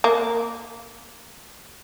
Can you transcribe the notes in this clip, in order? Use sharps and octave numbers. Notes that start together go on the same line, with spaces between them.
A#3